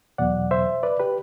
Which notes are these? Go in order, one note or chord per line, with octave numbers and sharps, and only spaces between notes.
E2 B2 F#3 D5 F#5
C5 E5
B4 D5
G4 B4